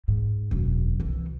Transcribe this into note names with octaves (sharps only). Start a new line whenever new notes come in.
G#2
E1 F#2
C2 E3